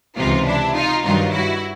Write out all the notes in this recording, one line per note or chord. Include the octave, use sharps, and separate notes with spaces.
C#2 C3 E3 D#4 F4
D4 E4
D#4 F4
G2 D#3 F#3 D#4 F4
E4 F#4